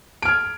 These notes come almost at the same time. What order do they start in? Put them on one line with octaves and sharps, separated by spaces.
D7 F6 G#6